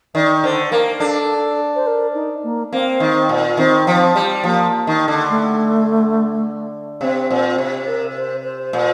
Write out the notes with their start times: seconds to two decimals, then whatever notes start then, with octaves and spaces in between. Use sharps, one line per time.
0.15 D#3 D5
0.44 D3 C5
0.72 A#3 A#4
1.00 D4 A4
1.75 C5
1.87 A#4
2.15 D#4
2.44 A#3
2.72 A#3 C4
3.00 D#3
3.29 A#2
3.57 D#3 C4
3.87 F3
4.15 G3
4.44 F3 A#3
4.87 D#3
5.08 D3
5.30 A3
7.01 C3 C4
7.31 A#2
7.58 C3
7.87 A#4
8.16 C5
8.44 C5
8.73 A#2